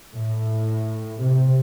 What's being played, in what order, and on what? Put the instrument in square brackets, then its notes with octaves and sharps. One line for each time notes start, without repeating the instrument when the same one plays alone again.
[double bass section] A2
C3